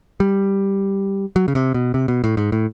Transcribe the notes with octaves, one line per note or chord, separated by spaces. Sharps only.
G3
F#3
C#3
C3
B2
C3
B2
A2
G#2
A2